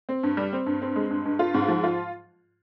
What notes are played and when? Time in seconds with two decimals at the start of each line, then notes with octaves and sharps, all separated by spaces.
0.09 C4
0.23 G2
0.37 G3
0.53 C4
0.66 G2
0.82 C4
0.96 G#3
1.10 G2
1.25 G2
1.39 F4
1.54 G#2
1.68 F3
1.84 F4